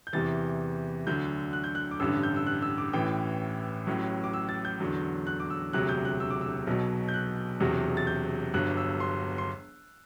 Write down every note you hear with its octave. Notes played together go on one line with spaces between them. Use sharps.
G6
E2 C3 E3 A6
D2 D3 F#3 G6
F#6
G6
F#6
D6
A1 G2 D3 E6
G6
E6
F#6
E6
D6
A1 A2 E3 G5
A1 A2 F#3
D6
E6
A6
G6
E2 D3 F#3
F#6
D6
E6
E1 D2 C3 F#3 F#6
G6
F#6
E6
D6
E6
B1 B2 F#3
G6
F#6
E1 E2 C3 F#3
A6
G6
G1 G2 F#3 F#6
E6
C6
C6